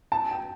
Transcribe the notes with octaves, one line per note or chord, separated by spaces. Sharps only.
A5
G5